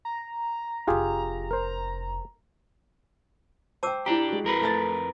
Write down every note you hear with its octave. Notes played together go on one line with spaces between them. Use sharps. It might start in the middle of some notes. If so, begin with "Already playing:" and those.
A#5
F1 D4 F4 G4 G#4
A#4 C5
C5 G5 A5 D6 E6
D4 E4 G4 A#5
G#3 F#4
F2 A#4 B4
A3 A5 A6